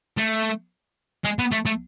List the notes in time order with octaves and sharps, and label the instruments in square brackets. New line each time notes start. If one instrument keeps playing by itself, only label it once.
[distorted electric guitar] A3
G#3
B3
A3
A3